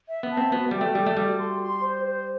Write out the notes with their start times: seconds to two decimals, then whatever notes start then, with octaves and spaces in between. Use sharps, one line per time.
0.09 E5
0.23 B3
0.31 A5
0.37 C4
0.52 B3 F#4
0.71 G3 G5
0.81 A3
0.95 G3 A4
1.06 A3
1.17 G3 F#4
1.39 C6
1.60 C6
1.82 C5
2.04 C5